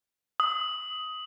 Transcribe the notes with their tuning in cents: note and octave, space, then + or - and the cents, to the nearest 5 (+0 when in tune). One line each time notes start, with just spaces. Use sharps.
D#6 +15